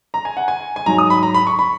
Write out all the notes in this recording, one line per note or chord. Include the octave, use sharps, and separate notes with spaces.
A#5
G#5
F#5
G#5
G#5
G#2 F#3 A#5
D#6
B5
A#5
B5
C#6
B5